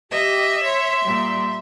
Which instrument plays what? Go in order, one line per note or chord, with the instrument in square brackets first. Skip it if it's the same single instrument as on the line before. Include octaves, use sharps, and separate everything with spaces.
[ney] G4 [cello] D#5 [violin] E5
[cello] C#5 [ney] C6
[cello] A#2 G3